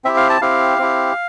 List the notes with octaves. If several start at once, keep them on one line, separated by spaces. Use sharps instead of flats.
C4 E4 G4 E5
F5
A5
C4 E4 G4 F5
C4 E4 G4